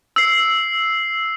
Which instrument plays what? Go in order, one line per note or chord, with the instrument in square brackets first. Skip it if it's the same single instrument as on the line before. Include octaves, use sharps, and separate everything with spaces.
[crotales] E6 C7